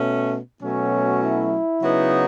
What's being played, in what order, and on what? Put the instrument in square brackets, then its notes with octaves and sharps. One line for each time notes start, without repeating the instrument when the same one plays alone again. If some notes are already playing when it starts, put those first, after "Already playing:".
Already playing: [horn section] B2 A3 C#4
B2 F#3 A3 C#4
E4
C#3 F#3 B3 D#4